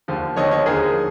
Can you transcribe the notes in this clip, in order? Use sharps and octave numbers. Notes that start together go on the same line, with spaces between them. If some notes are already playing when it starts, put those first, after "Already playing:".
D#2 D3 F3
D#2 D3 F3 C#5 D#5
C#5 D#5
D#2 D3 F3 G#4 A#4